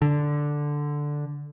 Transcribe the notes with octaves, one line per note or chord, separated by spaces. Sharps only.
D3